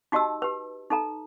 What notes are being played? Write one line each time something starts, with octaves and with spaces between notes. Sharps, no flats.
D#4 F#4 G4 D#5 A5 E6
G4 B4
D#4 A4 A#5